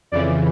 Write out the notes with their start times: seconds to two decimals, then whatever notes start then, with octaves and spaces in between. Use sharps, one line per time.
0.12 F2 C#3 E3 D5